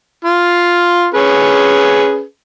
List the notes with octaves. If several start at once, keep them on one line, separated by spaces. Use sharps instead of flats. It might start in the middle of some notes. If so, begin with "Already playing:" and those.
F4
C#4 G#4 B4